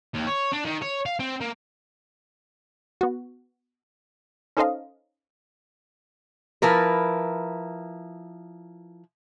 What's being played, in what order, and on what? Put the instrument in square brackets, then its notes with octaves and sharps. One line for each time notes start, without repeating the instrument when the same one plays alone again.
[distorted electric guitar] D#2
C#5
D4
D#3
C#5
F5
C4
A#3
[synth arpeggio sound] B3 F#4
C#4 D#4 A4 C5 D#5 F5
[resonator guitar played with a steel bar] F3 E4 A#4 B4